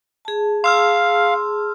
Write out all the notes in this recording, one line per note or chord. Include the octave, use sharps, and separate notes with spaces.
G#4 A5
F5 C6 E6 F6